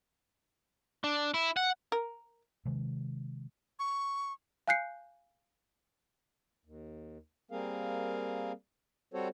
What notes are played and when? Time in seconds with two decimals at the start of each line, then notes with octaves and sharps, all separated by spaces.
1.04 D4
1.34 E4
1.57 F#5
1.92 A#4
2.65 C3 D#3 G#3
3.79 C#6
4.68 F5 G#5 F#6 G6 C7 C#7
6.65 D#2
7.51 G3 A#3 C4 G#4 A#4 F5
9.14 G3 C4 F#4 A4 C5 C#5